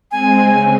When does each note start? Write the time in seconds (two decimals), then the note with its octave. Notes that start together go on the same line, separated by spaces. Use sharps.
0.11 G#3 C4 G#5
0.39 C#3